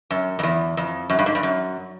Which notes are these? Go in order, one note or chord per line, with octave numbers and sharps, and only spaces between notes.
F#2
F2
E2
F2
F#2
G2
G#2
G2
F#2